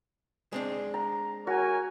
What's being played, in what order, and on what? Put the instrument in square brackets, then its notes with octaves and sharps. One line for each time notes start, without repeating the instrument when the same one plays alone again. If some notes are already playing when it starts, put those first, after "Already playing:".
[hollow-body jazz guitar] G#3 C4 D4
[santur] A#5
[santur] F#4 [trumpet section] A#4 C#5 G#5